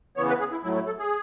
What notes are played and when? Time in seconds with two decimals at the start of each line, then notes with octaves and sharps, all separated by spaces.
0.17 C#3 E3 B3 C#5
0.29 B4
0.40 G#4
0.51 E4
0.63 A2 F#3 A3 E4
0.76 E4
0.86 A4
0.99 G#4